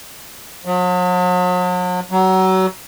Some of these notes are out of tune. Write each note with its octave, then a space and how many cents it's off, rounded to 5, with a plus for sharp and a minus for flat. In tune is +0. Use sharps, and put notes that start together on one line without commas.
F#3 -45
F#3 +25